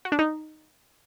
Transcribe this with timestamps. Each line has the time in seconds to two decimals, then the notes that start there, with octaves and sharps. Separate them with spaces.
0.05 F#4
0.12 D4
0.19 D#4